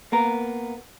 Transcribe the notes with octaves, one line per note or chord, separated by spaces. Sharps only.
A#3 B3 A#4